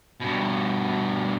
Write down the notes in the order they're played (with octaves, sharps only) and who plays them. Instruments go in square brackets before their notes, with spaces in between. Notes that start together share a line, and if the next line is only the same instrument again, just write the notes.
[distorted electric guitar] G2 B2